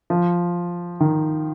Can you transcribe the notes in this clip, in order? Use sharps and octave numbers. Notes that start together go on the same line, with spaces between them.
F3
D#3